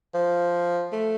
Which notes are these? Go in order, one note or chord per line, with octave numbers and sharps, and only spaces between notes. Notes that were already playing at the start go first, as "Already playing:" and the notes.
F3
A3